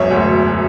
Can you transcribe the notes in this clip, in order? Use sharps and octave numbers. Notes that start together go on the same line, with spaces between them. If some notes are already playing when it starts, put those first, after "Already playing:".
Already playing: E1 F#2 C#5 E5
D2